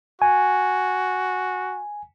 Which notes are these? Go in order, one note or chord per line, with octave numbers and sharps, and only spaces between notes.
F#4 G#5